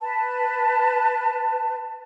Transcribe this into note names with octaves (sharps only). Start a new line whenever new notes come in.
B4 A5